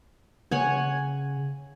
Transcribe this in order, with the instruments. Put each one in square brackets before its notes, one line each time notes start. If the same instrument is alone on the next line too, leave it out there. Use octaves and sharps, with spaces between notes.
[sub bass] C#3 [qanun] C#5 F#5 G#5